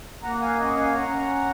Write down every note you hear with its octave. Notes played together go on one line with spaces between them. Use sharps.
A#3 F#5 A#5
F5 G#5
C#4 D#5 F#5
F5 G#5
C#4 F#5 A#5